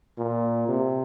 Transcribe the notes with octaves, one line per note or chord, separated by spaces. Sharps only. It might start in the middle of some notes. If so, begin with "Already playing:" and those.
A#2
C3